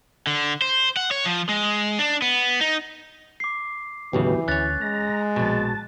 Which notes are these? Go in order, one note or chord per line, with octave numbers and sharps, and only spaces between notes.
D3
C5
F#5
C#5
F3
G#3
D4
B3
D#4
D6 C7
D#2 A2 C#3 E3 F#3 B3 G4
D2 C#4 C#5 F#6 A6
G#3 A#5
A#1 B2 A5